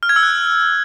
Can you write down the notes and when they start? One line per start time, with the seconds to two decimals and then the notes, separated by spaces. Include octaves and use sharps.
0.03 F6
0.09 G#6
0.16 E6
0.23 F#6